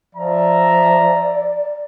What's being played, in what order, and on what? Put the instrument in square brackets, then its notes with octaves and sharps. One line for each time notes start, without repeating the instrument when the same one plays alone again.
[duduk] F3 [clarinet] D5 [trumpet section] E5 A#5